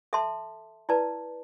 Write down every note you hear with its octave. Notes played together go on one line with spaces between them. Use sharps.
A4 E5 A5 C6
E4 B4 D5 A5